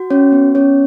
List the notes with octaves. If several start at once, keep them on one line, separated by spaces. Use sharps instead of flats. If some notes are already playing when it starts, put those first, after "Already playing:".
Already playing: F#4
C#4 C#5
B3
C#4 C#5